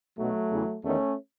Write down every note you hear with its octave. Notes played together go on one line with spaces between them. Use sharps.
B1 B2 F#3 A3
E2 C#3 E3
E2 D#3 A3 C#4